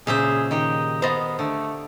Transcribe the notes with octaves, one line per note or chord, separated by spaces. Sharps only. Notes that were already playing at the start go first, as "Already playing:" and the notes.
A#2 C#3 G#4 C5 E5 F5
D#3 G4 D#5
B3 C5 D#5 F5
D3 A3